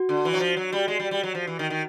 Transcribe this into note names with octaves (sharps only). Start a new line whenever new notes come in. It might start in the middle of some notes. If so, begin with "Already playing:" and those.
Already playing: F#4
D3
E3
F#3
F3
F#3
G3
G#3
G3
G3
F#3
F3
E3
D#3
D#3